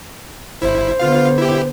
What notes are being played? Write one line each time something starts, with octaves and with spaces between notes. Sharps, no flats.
G1 E4 C5
D3 B3 F4 F5
E4 G4